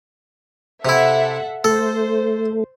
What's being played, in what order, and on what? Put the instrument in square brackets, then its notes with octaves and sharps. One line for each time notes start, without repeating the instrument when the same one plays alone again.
[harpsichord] C3 E4 [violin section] A4 E5 F#5
[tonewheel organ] A3 [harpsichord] A4 [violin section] C5